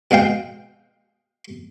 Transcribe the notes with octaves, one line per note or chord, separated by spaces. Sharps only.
B2 G#3 F5 G5